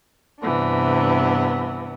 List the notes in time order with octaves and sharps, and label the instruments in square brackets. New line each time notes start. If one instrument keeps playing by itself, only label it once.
[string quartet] G2 C3 E3 B3 D4